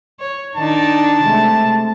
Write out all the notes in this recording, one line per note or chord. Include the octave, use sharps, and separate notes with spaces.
C#5
D#3 D4 D#4 A5
C3 G#3 A3